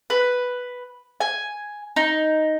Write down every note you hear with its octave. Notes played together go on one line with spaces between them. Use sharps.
B4
G#5
D#4